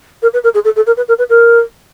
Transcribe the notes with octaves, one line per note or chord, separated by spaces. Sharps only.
A#4
B4
A#4
G#4
A4
A4
A#4
B4
A#4
B4
A#4